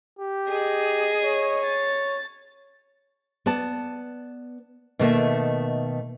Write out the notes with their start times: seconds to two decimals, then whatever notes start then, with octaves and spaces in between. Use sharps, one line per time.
0.19 G4
0.50 G#4 D#5
1.24 C#5
1.64 A6
3.46 B3 D5 A5
4.99 B2 D#3 A3 A#3 D#4 E5